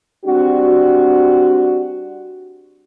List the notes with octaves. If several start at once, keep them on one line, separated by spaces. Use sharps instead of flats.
G3 C4 D4 F#4